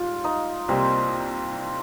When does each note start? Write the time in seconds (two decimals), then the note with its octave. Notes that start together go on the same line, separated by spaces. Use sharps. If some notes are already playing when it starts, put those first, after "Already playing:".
Already playing: G#2 G3 F4 F5
0.24 D#4 D#5
0.68 C2 C3 G3 A#3 C4 C5